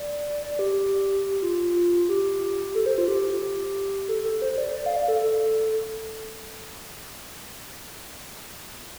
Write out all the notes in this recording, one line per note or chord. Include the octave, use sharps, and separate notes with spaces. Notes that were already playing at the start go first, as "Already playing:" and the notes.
Already playing: D5
D5
G4
F4
G4
A4
C5
F4
G4
A4
A4
C5
D5
D5
F5
D5
A4